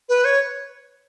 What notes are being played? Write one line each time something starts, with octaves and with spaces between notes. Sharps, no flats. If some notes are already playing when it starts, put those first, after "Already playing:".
B4
C#5